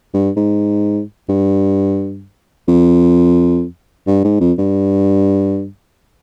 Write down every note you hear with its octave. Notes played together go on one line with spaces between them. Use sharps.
G2
G#2
G2
F2
G2
G#2
F2
G2